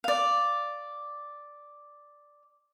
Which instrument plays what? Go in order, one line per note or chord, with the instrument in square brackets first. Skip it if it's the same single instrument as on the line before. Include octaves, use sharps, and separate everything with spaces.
[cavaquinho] D5 F5